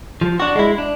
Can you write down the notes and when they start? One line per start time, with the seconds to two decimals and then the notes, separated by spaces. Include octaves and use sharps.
0.21 F3
0.40 D4 F#4
0.56 G#3 E4
0.78 D4